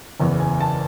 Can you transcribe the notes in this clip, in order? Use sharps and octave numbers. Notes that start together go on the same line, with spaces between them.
F#1 E2 C#3 E3
G#5
A5